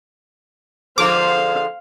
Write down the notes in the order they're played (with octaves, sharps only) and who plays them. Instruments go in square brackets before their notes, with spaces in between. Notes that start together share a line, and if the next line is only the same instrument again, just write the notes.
[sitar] D3 F3 G#3 [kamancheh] C5 [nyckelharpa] F5 [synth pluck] D6